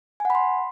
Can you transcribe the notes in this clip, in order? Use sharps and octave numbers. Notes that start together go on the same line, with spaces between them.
F#5 G#5 B5 C6